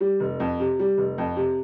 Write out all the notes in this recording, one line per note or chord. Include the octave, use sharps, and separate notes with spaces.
G3
F1
F2
C3
G3
F1
F2
C3